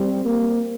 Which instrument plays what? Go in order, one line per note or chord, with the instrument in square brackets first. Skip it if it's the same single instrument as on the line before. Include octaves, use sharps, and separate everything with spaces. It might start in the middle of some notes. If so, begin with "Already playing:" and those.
Already playing: [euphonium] G3 [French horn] C4
[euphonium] A#3